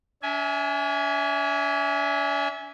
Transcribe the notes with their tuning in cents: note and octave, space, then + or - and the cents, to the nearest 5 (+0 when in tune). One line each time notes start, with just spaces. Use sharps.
D4 -45 E5 -20 G#5 +0